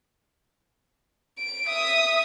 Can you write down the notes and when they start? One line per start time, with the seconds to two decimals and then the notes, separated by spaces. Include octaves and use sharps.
1.38 D7
1.68 E5 D#6